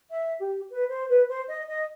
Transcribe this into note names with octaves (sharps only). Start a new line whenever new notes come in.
E5
G4
B4
C5
B4
C5
D#5
D#5